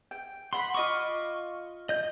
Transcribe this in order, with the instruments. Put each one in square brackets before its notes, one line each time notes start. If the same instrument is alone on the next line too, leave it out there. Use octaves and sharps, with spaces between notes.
[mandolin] G5
[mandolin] F#5 B5 [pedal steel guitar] C6
[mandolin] F4 D#5 D6 [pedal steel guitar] C#6
[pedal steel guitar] D#5 G6